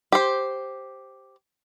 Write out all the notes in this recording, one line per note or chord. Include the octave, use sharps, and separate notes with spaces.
G4 C5